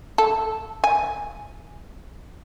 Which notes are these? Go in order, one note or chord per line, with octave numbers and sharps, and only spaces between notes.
A4
G#5